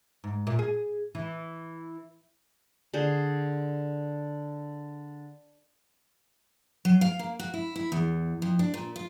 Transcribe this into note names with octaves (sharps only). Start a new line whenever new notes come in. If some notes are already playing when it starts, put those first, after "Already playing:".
G#2
A#2
G#4
E3
D3 G#4 C5
F#3
F5
A#3
F#4
E4
E4
E2
F2
D4
A#2
F4